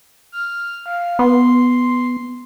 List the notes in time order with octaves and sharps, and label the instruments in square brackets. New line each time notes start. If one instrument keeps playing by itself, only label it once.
[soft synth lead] F6
F5
[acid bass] B3 [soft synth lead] C6